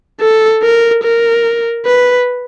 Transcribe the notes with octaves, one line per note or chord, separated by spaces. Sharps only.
A4
A#4
A#4
B4